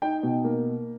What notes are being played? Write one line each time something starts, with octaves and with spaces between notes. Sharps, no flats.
D#4 G5
B2
A#3